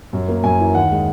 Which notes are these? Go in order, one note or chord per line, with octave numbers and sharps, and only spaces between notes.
F#2
A#3
F#2 G#5
E3
D#2 F#5
G#3